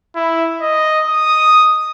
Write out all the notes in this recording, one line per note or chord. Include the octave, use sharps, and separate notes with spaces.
E4
D#5
D#6